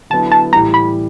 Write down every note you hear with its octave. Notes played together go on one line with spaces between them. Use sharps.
D3 F#3 B3 E4 A5
A5
A2 E3 G3 A#5
B5